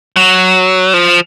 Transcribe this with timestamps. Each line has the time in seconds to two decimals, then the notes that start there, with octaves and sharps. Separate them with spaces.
0.16 F#3
0.94 F3